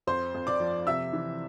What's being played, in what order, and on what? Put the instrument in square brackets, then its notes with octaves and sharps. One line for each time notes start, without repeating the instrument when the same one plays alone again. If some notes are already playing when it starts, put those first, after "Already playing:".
[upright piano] F2 C5 C6
F2
D5 D6
F3
C3 E5 E6
E3